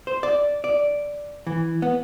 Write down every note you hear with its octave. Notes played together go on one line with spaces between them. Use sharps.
C5
D5
D5
E3
B3